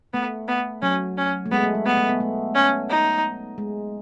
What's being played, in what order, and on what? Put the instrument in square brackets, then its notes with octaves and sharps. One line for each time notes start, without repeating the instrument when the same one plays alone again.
[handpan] A3 [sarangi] B3
[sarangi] B3
[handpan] F#3 [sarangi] C#4
[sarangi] C#4
[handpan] A3
[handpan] G#3 [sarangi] B3
[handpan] A3
G#3
[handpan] A3 [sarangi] B3
[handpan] A3
B3
A3
[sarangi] C#4
D#4
[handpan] G#3